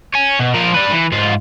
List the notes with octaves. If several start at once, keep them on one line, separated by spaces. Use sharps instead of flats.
C#5 G#5
B2
F3 A#4
D4 B4
E3
G#2 F4